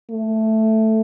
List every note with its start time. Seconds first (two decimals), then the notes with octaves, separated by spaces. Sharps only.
0.11 A3